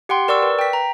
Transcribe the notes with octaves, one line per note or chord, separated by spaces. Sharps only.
G4 F#5 G5 C6
A#4 D5 C#6 E6
B4
G5 B6
A#5